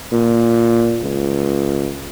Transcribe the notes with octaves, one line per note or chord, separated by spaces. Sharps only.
A#2
C#2